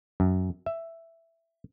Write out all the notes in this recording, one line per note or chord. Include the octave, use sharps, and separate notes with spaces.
F#2
E5